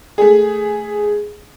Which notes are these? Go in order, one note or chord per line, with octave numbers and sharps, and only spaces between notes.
A3 G#4